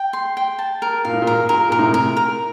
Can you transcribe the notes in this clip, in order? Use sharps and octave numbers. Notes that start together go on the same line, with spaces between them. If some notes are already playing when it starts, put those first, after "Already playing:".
Already playing: G5
C6
G5
A5
A#4
A#2 F5
A2
A#2
A#4
A#2 A#4
A#2 A#4
A2 C3
A#4
A#4